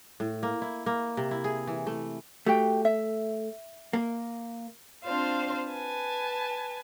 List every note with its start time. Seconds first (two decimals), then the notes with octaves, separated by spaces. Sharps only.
0.20 A2
0.43 A#3
0.62 E4
0.86 A#3
1.17 C3
1.31 E4
1.44 G#4
1.67 E3
1.87 A3
2.46 A3 F#4 G4 G5
2.85 E5
3.93 A#3
5.04 C4 D4 F4 C5 F5
5.72 B4 G#5 A5